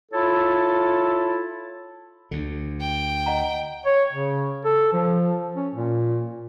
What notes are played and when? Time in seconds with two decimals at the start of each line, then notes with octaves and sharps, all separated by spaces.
0.12 E4 F4 A4 C#5 A5
2.31 D2 D3
2.81 G5
3.26 D#5 F#5 A#5
3.86 C#5
4.13 C#3
4.65 A4
4.93 F3
5.56 C#4
5.75 A#2